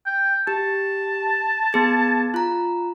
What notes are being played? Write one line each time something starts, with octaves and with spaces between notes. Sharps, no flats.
G5
G4 A5
B3 G#4 G#6
F4 A#5